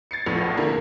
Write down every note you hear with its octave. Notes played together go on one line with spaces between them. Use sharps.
G#6 A6 C7 C#7
F1 A#1 E2 A2 F3
D3 A#3 E4 A#4